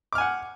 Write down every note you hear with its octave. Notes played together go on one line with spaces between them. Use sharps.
F#5 G#5 D6 F6